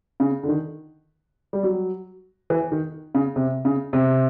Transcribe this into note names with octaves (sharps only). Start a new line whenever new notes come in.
C#3
D3
D#3
G3
F#3
E3
D#3
C#3
C3
C#3
C3